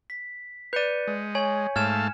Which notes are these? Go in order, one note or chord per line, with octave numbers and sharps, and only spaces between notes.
B6
B4 D5 G6 C#7 D#7
G#3
C#5 G#5 G#6
G#2 A3 F5 A5 F6 G#6 E7